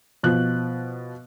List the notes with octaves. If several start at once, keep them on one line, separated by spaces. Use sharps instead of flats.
B2 F3 F#6